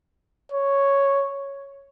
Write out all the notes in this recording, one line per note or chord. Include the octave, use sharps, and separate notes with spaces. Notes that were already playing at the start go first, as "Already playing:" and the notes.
C#5